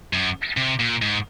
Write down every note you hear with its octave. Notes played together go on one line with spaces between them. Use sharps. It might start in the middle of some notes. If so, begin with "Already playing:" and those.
F#2
C3
A#2
G#2